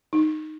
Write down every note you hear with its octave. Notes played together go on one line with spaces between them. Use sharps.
D#4